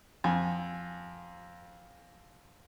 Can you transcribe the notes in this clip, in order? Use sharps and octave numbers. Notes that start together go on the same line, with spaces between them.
F2 G#5